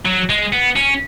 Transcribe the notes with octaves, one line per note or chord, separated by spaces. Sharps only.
F#3
G#3
B3
C#4